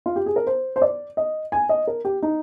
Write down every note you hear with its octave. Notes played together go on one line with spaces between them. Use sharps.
F4
G4
G#4
A#4
C5
C5
D5
D#5
G#5
D#5
A#4
G4
D#4